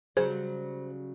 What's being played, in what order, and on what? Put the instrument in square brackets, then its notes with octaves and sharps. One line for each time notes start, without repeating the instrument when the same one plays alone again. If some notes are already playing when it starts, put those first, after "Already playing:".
[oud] C#3 F#3 G3 [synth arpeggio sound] G#4 [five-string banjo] C5